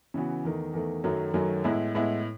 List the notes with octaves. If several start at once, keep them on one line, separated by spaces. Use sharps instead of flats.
C#3 E3 B3 F#4
E2 D#3 A3
E2 D#3 A3
F#2 D#3 F#3 A3
F#2 D#3 F#3 A3
A2 G#3 B3 E4
A2 G#3 B3 E4